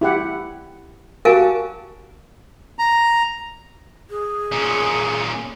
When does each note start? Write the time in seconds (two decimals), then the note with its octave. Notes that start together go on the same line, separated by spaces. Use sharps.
0.01 E4 G4 F#5
1.25 F#4 G4 A#4 F5 G#5 A5
2.79 A#5
4.10 G#4
4.52 A#2 C#4